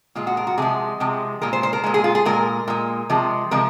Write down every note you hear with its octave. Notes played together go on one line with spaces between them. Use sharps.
A#2 G#3 F4
F#4
A#4
F#4
C3 F3 G#3 G#4
C3 F3 G#3
A#2 G#3 A#4
C5
C5
A#4
A#2 G#3
G#4
F4
G#4
A#2 G#3 A#4
A#2 G#3
C3 F3 G#3
C3 F3 G#3 A#4